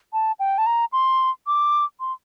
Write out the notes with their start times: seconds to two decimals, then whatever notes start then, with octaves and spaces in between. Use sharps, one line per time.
0.13 A5
0.39 G5
0.58 A5
0.66 A#5
0.92 C6
1.47 D6
2.00 C6